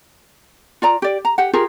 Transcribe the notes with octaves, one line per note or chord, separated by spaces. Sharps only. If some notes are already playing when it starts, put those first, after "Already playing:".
F4 D5 A#5
G4 D5
A#5
G4 F#5
F4 G4 G#4 A#4